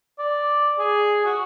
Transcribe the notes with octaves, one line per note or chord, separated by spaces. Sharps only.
D5
G#4
F#4